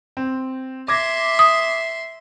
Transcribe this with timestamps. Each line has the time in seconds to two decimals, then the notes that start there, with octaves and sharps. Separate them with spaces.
0.17 C4
0.88 E5 C6 D6 G#6 A#6
1.39 D#6